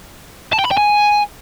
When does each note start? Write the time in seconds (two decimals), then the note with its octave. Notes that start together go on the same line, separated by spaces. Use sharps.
0.53 A5
0.59 G5
0.65 B5
0.71 G5
0.77 G#5